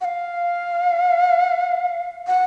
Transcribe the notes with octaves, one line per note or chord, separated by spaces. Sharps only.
F#5
F5
F#5